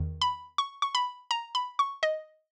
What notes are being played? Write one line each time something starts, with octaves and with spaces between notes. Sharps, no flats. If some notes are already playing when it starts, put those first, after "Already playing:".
Already playing: E2 D#3
B5
C#6
C#6
B5
A#5
B5
C#6
D#5